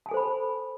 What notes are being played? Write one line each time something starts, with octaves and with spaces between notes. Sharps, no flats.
A4 C5 G#5 A5 B5